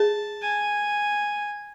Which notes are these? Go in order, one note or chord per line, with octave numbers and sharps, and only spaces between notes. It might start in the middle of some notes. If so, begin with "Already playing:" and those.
Already playing: G#4 A5
G#5